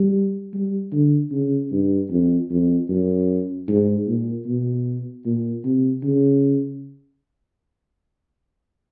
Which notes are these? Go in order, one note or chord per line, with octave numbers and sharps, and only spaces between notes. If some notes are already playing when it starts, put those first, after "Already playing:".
Already playing: G3
G3
D3
C#3
G2
F2
F2
F#2
G#2
A#2
B2
A#2
C3
C#3